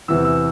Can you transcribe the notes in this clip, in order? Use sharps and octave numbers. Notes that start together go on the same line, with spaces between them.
E2 C3 E3 E6
E6